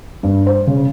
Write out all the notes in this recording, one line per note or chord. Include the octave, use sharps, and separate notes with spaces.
G2
C5
C#3